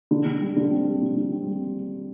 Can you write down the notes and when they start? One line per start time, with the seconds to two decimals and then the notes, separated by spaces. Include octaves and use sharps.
0.11 D3
0.26 D3
0.41 G3
0.56 D3
0.71 C4
0.87 G3
1.01 D3
1.16 D3
1.32 C4
1.47 G3